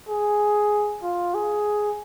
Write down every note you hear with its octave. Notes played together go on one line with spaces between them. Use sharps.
G#4
F4
G#4